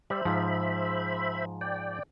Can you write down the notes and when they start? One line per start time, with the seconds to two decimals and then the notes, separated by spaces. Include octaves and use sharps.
0.10 G3 C5 E5 B5
0.25 G#2 F3
1.61 D5 G5